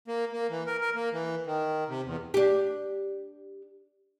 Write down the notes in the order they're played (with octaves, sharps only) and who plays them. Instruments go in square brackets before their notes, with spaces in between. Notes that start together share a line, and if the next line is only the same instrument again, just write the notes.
[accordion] A#3
A#3
E3
A#4
A#4
A#3
E3
D#3
C3
E2
[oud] D4 G4